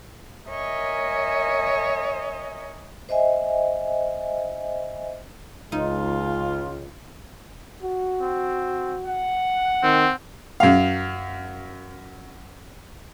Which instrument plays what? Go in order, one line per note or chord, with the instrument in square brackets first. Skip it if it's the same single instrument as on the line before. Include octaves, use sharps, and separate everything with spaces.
[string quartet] A#4 C#5 D#5 E5 G#5
[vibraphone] C5 D#5 E5 G#5
[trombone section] C#2 [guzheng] D#4 [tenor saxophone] F4
[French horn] F#4
[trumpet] C4
F#5
[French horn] D#3 [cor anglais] C4
[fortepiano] F#2 F5